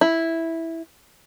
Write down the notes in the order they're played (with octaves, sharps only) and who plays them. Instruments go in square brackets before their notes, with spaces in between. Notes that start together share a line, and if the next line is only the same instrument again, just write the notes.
[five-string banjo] E4